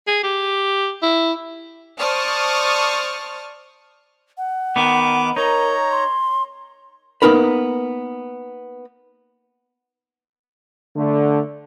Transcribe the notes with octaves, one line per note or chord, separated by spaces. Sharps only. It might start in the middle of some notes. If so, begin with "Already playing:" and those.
G#4
G4
E4
C5 D5 A5 C#6 D#6 F6
F#5
D#3 B3 D6
D#4 A#4 C#5 A#5
C6
A#3 B3 C#4 D#4 A#4 B4
D3 A3